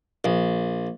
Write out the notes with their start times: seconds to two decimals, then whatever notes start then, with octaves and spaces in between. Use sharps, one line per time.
0.24 A#1